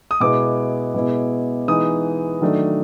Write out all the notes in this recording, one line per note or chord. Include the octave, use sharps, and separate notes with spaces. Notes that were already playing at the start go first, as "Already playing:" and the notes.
D#6
B2 G#3 B3 E4 D6
B2 G#3 B3 E4
E3 G#3 B3 D#4 D#6
D#3 F#3 A3 D4